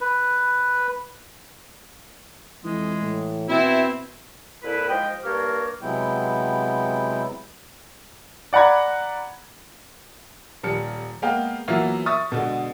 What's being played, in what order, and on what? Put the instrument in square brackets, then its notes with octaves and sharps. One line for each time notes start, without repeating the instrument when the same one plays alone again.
[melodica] B4
[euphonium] F2 [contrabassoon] E3 [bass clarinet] G#3
[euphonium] A2
[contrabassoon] B2 [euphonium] B3 [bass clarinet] C4 [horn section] E4
[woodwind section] F2 A#2 E4 B4
G#2 F3 G#3 D#5 G5
G2 A#3 G4 A#4 C#5 F6
[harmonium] C3 F#3 G#3 B3 E4 G5
[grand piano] D5 F#5 A#5 B5 G#6
[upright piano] D#1 F3 G3 C#7
G#3 A#3 B3 F5 G5
E3 F#3 A#3 B3 E4 F4
E5 C#6 D#6 A6
B2 D3 G#3